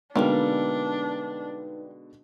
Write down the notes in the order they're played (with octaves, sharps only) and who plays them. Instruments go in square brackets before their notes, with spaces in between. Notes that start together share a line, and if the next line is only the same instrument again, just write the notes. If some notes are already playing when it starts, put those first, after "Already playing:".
[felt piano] B2 D3 G#3 [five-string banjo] G3 A#3 [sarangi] D4 [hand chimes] D#4 B4